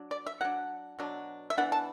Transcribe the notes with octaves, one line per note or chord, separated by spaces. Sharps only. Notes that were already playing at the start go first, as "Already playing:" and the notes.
Already playing: F#3 D4
D5
E5
F#3 D4 F#5
B2 F#3 D4
E5
E3 B3 D4 F#5
A5